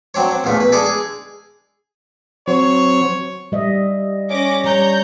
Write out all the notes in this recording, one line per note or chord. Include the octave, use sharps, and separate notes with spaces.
F#3 C4 D4 C#5
C4
A1 E2 A#2 A3
B4
G#3 D4 G#4 A4 D5
G#4
F#3 C4 C5 C#5
G3 D#5 E5
C#4 D6 A#6
G3 C#5 A#5 G6